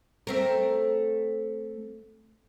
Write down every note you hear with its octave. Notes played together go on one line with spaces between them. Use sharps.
A3 C4 A#4